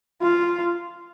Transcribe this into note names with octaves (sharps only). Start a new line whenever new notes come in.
F4